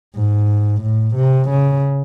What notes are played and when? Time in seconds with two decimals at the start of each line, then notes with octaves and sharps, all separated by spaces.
0.15 G#2
0.82 A2
1.16 C3
1.50 C#3